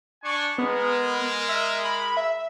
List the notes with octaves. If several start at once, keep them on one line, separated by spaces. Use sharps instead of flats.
D4 G#5 C#6
G#3 B3 A#4
E5
B5
E5